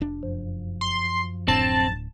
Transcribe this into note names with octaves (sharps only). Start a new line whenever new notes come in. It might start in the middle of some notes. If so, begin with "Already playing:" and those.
F1 D4
F#2 F3
C6
D1 A2 C4 D4 A5